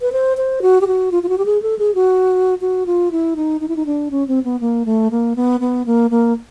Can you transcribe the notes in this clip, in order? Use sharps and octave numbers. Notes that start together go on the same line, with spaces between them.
B4
C5
C5
F#4
G4
F#4
F4
F4
F#4
G4
G#4
A4
G#4
F#4
F#4
F4
E4
D#4
D#4
E4
D#4
D4
C#4
C4
B3
A#3
A3
A#3
B3
B3
A#3
A#3